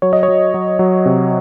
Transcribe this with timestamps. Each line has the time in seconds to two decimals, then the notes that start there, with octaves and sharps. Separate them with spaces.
0.02 F#3 C#5
0.13 D#5
0.23 C#5
0.28 F#3
0.54 F#3
0.79 F#3
1.06 C3